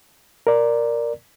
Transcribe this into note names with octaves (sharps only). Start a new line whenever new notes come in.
A#4 D5